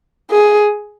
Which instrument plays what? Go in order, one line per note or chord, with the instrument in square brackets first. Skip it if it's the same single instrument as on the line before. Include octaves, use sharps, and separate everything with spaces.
[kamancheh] G#4